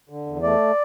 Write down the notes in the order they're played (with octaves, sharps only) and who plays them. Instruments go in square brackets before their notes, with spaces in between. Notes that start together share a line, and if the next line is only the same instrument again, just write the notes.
[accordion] D3
E2
A3 D5